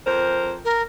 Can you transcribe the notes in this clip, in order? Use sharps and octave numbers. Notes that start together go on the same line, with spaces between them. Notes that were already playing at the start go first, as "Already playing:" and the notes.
F2 A#4 C5
A#4